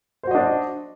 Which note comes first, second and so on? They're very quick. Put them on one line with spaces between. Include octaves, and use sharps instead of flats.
C5 F#4 D#5 D4